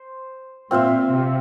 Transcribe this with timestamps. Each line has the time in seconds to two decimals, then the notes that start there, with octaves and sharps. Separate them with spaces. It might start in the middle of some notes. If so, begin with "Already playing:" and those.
Already playing: C5
0.71 A#2 C4 F4 C5 E5
1.11 C3